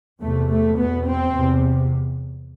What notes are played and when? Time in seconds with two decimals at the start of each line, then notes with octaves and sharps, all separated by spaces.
0.21 E2 C3 A3
0.49 A3
0.77 E2 B2 B3
1.06 C4
1.34 E2 C3